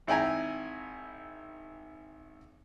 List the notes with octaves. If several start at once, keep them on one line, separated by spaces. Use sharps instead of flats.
G#1 E4 G5 G#5 A#5